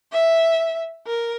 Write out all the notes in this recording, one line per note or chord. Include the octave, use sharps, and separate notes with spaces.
E5
A#4